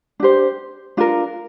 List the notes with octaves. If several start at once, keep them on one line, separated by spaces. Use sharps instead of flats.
D4 G4 C5
D4 F4 A#4